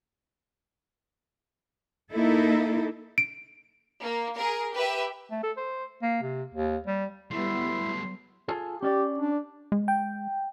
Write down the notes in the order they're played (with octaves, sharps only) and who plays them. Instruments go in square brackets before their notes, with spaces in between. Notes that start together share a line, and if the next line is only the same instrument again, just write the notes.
[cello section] A#3 D#4 E4 A4
[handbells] D7
[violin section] A#3
G#4 A#4
G4 B4 E5
[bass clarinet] A3
A4
C5
A#3
C3
D#2
G3
[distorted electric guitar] F#3 A3 [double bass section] G3 B3 [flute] E4 [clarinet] C6
[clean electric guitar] F4 G#4 A4
[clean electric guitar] C#4 D5 [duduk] G4
[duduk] D4
[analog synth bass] G#3
[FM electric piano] G5